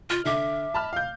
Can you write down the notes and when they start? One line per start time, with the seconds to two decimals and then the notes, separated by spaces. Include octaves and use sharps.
0.10 F4 F6
0.25 D3 E5 D6
0.74 A5 B5 F6
0.93 F5 G6